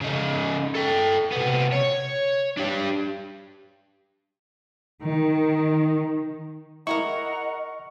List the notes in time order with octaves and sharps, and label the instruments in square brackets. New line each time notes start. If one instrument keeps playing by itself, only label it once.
[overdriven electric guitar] C#3 D#4
A4 G5
C3 B3
C#5
D4 G4
[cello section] D#3
[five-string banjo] E4 G#4 A#4 [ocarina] D#5 [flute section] F#5 A#5 [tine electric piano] C#6